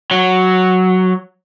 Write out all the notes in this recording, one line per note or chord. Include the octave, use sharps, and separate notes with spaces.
F#3